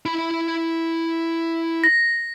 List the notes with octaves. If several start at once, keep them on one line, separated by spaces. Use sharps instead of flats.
E4 B5
A#6